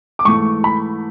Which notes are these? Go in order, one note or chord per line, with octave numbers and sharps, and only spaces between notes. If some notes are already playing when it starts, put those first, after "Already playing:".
D6
G#2 E3 A3 C#6
B5